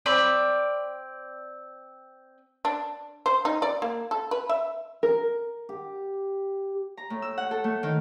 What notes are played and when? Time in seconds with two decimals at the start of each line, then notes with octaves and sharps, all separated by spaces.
0.06 C4 D5 B5
2.65 D4
3.26 C5
3.45 D#4
3.62 D5
3.82 A#3
4.11 A4
4.31 B4
4.49 E5
5.03 A#4
5.69 G4
6.97 A#5
7.10 A2
7.22 E6
7.38 F#5
7.51 A4
7.64 A3
7.83 D#3